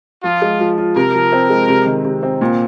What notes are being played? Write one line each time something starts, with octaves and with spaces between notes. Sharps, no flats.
F3 F4
G#3
F3
F4
C3 A#4
F3
C4
G#3
C3
D#3
C3
C4
A#2